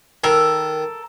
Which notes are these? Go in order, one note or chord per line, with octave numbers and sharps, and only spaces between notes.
D#3 A4 A#4